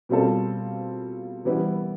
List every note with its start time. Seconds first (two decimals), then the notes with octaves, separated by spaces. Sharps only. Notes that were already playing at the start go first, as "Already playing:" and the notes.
0.09 B2 G3 C4 F4 A4
1.45 E3 G3 B3 E4